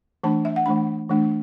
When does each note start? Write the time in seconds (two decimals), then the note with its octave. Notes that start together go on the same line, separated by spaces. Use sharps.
0.24 E3 A3 D4 A5
0.45 E5
0.56 F#5
0.66 E3 A3 D4 B5
1.09 E3 A3 D4